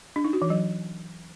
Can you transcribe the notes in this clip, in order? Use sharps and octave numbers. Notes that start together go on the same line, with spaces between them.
D4
D#4
F#4
E3
F#3